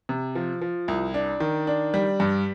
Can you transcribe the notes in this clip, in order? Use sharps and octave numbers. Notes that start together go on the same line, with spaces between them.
C3
F3
F3
C2
D4
D#3
D4
G3
G2